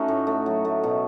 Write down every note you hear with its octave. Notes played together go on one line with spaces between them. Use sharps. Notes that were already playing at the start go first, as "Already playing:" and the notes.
Already playing: A3 C#4 D#4 F#4
A2
A3
F#3
A3
B2